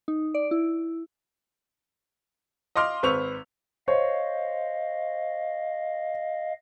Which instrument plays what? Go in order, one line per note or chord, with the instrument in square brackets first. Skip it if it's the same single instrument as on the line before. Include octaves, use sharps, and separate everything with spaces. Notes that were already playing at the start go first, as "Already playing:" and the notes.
[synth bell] D#4
D5
E4
[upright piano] D#5 F5 C6 D6 F6
G#1 B4 C5 C#6 E6 F7
[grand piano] C5 C#5 [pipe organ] D#5 F5